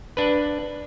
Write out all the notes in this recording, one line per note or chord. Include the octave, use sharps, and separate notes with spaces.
D4 B4